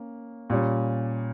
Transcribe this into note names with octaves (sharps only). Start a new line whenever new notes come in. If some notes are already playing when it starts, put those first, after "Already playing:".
Already playing: A#3 C#4
A#2 G3 C#4